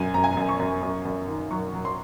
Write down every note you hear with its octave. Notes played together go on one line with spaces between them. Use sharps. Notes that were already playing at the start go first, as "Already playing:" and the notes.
Already playing: F#2 F#3 G#5
F#2 A#5
G#5
F#2 A#5
C#6
F#2
F#2
F#2
D#3
F#3 C#6
F#3
C6